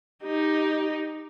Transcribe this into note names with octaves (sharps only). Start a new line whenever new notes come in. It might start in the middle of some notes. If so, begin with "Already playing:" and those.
D#4 G4